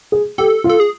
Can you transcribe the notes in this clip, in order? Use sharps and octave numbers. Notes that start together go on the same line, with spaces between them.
G#4
G4 A4
F4
A4
G#4